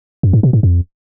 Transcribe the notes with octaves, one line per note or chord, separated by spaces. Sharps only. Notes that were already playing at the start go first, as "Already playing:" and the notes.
F#2
G#2
B2
G#2
F2